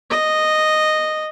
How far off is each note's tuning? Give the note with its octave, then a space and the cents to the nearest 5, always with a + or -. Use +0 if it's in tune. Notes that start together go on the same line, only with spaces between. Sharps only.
D#5 -10